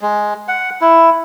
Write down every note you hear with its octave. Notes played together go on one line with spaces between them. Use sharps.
G#3
F#5
E4